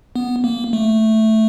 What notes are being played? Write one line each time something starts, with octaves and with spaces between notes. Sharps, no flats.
B3
A#3
A3